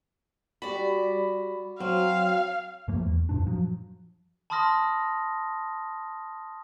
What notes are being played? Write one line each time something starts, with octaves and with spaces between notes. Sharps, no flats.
G3 F#4 D5 B5
F#3 C4 F5
G2 F3 A3 A#3
E2
F#2 A#2 D4
F3 F#3
A5 B5 C6 D#6 F6 A#6